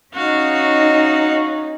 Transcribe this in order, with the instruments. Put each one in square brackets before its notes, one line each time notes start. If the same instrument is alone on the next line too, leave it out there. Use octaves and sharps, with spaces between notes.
[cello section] C#4 D#4 [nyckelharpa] F#4 F5